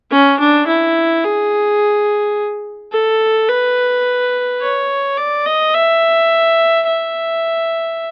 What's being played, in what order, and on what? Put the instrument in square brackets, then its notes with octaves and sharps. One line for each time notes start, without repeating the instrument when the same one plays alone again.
[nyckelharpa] C#4
D4
E4
G#4
A4
B4
C#5
D5
D#5
E5
E5